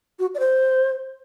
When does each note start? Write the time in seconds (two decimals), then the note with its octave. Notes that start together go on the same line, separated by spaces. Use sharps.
0.19 F#4
0.34 D5
0.39 C5